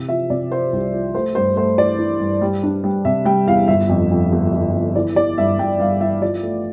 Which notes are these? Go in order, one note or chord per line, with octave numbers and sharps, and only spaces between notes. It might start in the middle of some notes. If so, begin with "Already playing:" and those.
Already playing: C3 E3
F3 E5
C3 D5
F3 C5
C2
F3
A3 C5
G2 C5
A3 C5
E3 D5
E3
G2
G3
D4
G3
C3 E5
G3 G5
E2 F5
G1 E5
F2
F2
G1
G1
F2
E3 D5
E3 D5
G2 E5
G2 G5
G2 F5
E3 E5
F3 D5
A3